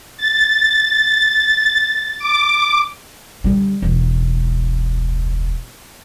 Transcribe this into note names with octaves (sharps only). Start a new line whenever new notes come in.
A6
D6
D3 G3
E1 C#2